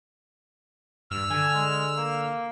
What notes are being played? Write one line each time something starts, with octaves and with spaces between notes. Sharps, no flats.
G2 E6 F6
D3 G#5
G#3
A#3